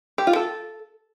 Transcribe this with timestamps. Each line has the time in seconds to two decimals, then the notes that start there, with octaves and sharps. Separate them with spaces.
0.18 G4
0.27 F4
0.36 A4